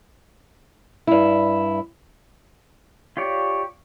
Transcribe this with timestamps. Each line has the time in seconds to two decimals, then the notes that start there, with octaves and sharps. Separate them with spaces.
1.07 G2 E4
3.17 F4 G4 C#5 D5